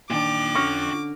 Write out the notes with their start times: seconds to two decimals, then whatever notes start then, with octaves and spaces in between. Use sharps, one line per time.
0.10 A#2 D#3 D4 F4 G5 D6
0.55 D3 C#4 C#5 C#6 F6 A#6